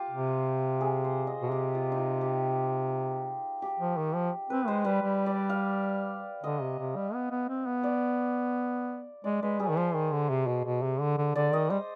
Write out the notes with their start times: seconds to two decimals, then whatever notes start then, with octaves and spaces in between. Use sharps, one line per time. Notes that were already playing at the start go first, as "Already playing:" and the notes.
Already playing: F4 G4
0.10 C3
0.81 G#4
1.05 C5
1.27 D#5
1.42 B2
1.51 C3 G4
1.75 F4
1.92 D#4
1.98 F4
2.21 G4
3.62 G4
3.79 F3
3.97 D#3
4.15 F3
4.50 C4 B4
4.67 G#3 C5
4.85 G3 B4
5.03 G3
5.26 D5
5.50 F5
6.43 D3 D#5
6.61 C3
6.79 C3
6.96 G3
7.14 B3
7.31 B3
7.49 C4
7.66 B3
7.83 D5
9.24 G#3 D5
9.42 G#3 B4
9.59 G3 G#4
9.69 D#3
9.77 F3 C5
9.95 D#3
10.12 D3
10.30 C3
10.47 B2
10.65 B2
10.83 C3
11.01 D3
11.18 D3
11.35 D3 D5
11.53 D#3 D#5
11.70 G3 C5